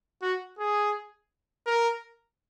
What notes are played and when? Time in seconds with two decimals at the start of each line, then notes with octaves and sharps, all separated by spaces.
0.22 F#4
0.59 G#4
1.66 A#4